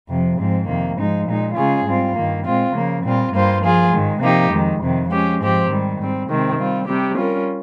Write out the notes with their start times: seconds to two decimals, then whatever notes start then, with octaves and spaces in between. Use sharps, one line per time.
0.09 F2 C3 F3
0.38 G#2 F3 C4
0.67 F2 C3 D#3 A#3
0.97 G#2 F3 G#3 D#4
1.27 A#2 G#3 D#4
1.56 C#3 G#3 C#4 F4 G#4
1.85 G#2 G3 C4 F4
2.15 G2 D#3 A#3
2.45 A#2 G#3 C4 F4
2.74 C#3 F3 A#3
3.03 A#2 G3 C4 F4
3.33 G2 G3 A#3 F4 C5
3.62 F3 A#3 F4 G#4
3.92 G#2 D#3 G#3
4.21 C3 F3 A#3 D#4 G4
4.51 F2 D#3 G#3
4.80 F2 C3 D#3
5.10 F3 G#3 C#4 G4
5.40 G#2 F3 C4 G4
5.69 G#2 D#3 G3
5.98 G#2 G3 C4
6.28 C3 D#3 G#3 C4
6.57 G3 C4 F4
6.87 C3 G3 C4 G4
7.16 G3 C#4 F4 A#4